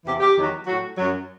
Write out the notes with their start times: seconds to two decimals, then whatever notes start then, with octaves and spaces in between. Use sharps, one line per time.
0.05 E2 C3 E3 G4
0.20 G4
0.36 E2 D#3 F#3
0.67 A2 F#3 F#4
0.98 F#2 F#3